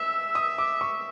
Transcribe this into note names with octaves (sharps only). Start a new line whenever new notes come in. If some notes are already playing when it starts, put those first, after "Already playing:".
Already playing: E5 E6
D#6
D6
C#6